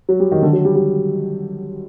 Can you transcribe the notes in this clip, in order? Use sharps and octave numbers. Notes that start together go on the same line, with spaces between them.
F#3
G3
D#3
D3
F#3
G3
G3